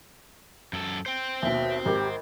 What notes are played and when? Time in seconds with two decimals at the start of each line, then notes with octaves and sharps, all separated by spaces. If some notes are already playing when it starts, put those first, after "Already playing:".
0.73 F#2 A4
1.06 C5 G5
1.42 D#2 B2 E5
1.85 G#1 G4 A#4